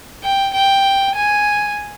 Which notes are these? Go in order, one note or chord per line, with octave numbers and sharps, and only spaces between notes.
G5
G5
G#5